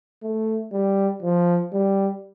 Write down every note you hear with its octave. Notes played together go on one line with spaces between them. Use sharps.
A3
G3
F3
G3